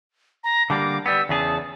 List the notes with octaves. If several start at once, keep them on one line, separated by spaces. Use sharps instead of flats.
A#5
D3 G3 A#3 D6
G3 B3 E6
E2 C#3 G#4 A5